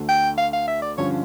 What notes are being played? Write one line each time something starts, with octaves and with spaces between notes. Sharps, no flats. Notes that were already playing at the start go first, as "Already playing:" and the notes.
Already playing: D2 D3 A3
G5
F5
F5
E5
D5
G2 D3 F3 C#4 F4 C#5